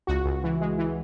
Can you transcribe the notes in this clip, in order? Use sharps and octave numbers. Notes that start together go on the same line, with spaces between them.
C#2 F#4
C#2
E3
G#3
E3